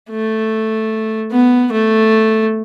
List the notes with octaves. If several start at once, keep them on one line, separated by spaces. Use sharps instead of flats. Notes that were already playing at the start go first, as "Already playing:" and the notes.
A3
B3
A3